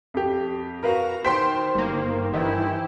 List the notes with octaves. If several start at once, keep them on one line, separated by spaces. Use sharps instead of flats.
F2 G4
F#4 A#4 B4 F5 A#5
D#3 C5 G5 C6 B6
G1 A#3
G2 D#3 E3 E4 G4